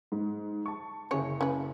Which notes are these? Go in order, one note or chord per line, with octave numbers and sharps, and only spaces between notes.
G#2
A5 C#6
F#1 C#4 G#4 C#5 C#7
C#4 B4